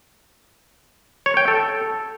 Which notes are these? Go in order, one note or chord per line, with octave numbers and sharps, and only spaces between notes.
C#5
G5
A4